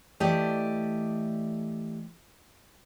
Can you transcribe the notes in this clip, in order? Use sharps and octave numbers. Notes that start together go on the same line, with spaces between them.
E3 A3 G4 D5 D#5